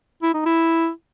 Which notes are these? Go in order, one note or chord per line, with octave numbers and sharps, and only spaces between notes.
E4
D#4
E4